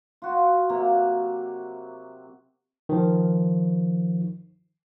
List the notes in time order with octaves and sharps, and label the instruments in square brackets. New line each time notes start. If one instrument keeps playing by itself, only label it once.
[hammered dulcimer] F4 F#4
C3 F#3 A#3
[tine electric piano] D#3 F3